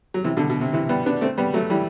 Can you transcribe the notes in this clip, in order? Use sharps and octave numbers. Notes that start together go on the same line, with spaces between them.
F#3
C3 E3
B2 D3
B2
C3
C3 E3
G3 B3
B3 D4
A3 C4
G3 B3
F#3 A3
E3 G3